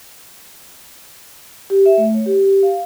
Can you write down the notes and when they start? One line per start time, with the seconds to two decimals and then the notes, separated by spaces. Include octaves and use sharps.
1.70 G4
1.86 E5
1.98 A3
2.14 C#5
2.26 G4
2.45 G4
2.63 F5